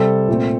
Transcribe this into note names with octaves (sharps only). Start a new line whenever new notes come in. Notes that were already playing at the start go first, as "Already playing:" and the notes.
Already playing: C3 G3 C4 A4
A#2 A3 C4